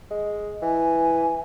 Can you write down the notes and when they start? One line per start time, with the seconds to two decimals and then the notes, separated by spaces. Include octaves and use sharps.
0.11 G#3
0.62 E3 G#5